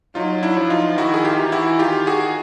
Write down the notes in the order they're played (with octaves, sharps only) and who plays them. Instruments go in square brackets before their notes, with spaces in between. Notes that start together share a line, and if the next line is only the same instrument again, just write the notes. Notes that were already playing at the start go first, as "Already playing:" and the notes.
[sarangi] F#3 [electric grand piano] D#4 F4
[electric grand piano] D4 E4
[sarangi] F3
[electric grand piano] D#4 F4
[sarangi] D#3 [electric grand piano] E4 F#4
[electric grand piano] G#4
F4 G4
[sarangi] E3
[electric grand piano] E4 F#4
[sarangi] D#3 [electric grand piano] F4 G4
[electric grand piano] F#4 G#4